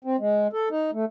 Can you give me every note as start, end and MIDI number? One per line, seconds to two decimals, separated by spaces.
0.04 0.16 60
0.19 0.47 56
0.53 0.69 69
0.70 0.91 63
0.93 1.05 57